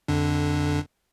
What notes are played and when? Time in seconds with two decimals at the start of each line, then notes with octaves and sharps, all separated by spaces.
0.08 F2 D3 D4